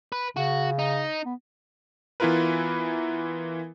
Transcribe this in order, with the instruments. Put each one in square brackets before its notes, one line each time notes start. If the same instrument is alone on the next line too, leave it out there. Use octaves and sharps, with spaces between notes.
[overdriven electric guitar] B4
[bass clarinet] C#3 [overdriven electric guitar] F#4
[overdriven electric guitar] D#4
[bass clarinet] B3
[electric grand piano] E3 B3 E4 F4 A#4 B4